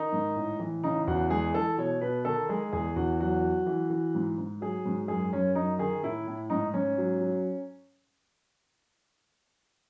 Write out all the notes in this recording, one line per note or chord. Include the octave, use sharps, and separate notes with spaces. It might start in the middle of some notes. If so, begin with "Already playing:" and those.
Already playing: D#3 D#4
G#2
A2
E3
C#3 D#4
E2 F#4
G#3 G#4
E3 A4
B2 C#5
B2 B4
D#3 A4
G#3 G#4
E2 G#4
E2 F#4
F#3 F#4
F#3
E3
E3
G#2
G#2
F#3 G#4
G#2
F#2 G#4
F#2 C#4
F#2 D#4
D#3 G#4
A2 E4
A2
G#2 D#4
G#2 C#4
F#3
F#3